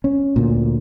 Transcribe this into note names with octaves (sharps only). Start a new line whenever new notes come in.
C#4
D2 A#2